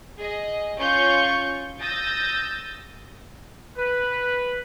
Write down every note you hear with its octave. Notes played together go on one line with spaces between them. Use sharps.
G#4 D#5
C#4 F4 C#6 G6
D#6 E6 G6 A6 A#6
B4